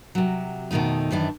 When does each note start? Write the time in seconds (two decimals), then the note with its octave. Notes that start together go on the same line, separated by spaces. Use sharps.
0.15 C3 F#3
0.71 F2 B2 D#3 A3 D#4
1.12 F#2 D#3 E3 D4